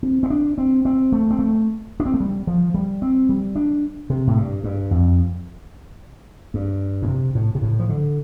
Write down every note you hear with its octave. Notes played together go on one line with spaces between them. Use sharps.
C4
C4
D4
C4
C4
A3
C4
A3
D4
C4
A3
G3
F3
G3
C4
G3
D4
C3
A2
G2
G2
F2
G2
A2
C3
A2
C3
A2
F3
D3